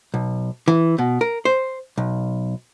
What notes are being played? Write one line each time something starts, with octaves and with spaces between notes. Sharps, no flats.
B1
E3
B2
A#4
C5
B1